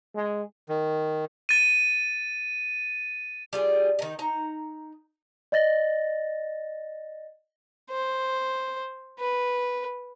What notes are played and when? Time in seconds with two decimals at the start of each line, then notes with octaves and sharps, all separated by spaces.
0.15 G#3
0.69 D#3
1.49 A6 D#7
3.53 G3 F4 G#4
3.99 D#3 D#4
4.19 D#4 A#5
5.52 D5 D#5 A6 A#6
7.91 C5
9.19 B4